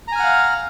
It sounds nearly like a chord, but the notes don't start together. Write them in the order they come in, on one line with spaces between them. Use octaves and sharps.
A#5 G#5 F6 F#5 F5